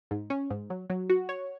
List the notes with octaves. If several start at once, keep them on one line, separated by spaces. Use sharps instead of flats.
G#2
C#4
G#2
F#3
F#3
F#4
C#5